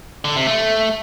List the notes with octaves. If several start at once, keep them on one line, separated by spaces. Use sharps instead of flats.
D3
C3
A3